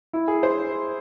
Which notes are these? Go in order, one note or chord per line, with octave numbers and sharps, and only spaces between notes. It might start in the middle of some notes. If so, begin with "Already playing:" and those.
E4
G#4
C5